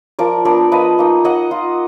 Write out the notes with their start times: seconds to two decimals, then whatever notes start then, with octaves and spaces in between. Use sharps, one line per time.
0.19 F3 A#4 D5
0.45 B3 D4 A#4 D5
0.72 F3 B4 D#5
0.99 A#3 D#4
1.24 A#3 D#5 F#5
1.51 F4